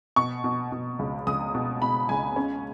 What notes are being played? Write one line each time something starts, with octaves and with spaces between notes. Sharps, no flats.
B2 C#6
B2
B2
C#2
C#2 D#6
B2
B2 B5
C#2 G#5
C#4